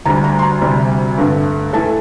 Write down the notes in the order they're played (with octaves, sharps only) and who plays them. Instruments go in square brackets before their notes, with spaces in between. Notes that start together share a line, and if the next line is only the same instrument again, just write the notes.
[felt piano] D2 D3 G3 A#5
A#5
C6
A#5
D2 C3 G3
G2 D3 A3
E3 A3 A5